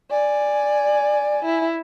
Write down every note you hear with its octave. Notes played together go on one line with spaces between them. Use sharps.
D5 G#5
E4